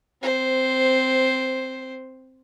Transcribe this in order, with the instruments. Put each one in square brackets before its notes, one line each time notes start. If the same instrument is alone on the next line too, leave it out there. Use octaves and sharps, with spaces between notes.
[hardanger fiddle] C4 C5